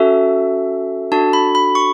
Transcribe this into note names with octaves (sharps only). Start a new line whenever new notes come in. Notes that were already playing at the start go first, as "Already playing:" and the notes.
Already playing: C#4 F#4 A4 E5
D4 F#4 A4 A5
B5
B5
C#6